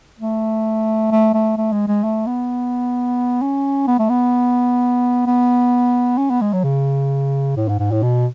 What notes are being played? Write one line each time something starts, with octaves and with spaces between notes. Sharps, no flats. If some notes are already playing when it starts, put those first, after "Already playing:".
A3
A3
A3
A3
G#3
G#3
A3
B3
C#4
B3
A3
B3
B3
C#4
B3
G#3
F#3
C#3
A2
G#2
G#2
A2
B2